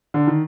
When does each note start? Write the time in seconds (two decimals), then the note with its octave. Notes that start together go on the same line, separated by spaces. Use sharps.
0.14 D3
0.27 D#3